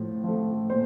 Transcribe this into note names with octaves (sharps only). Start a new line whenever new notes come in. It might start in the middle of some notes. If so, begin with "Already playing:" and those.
Already playing: A2 F3
F3 A3
A#2 C5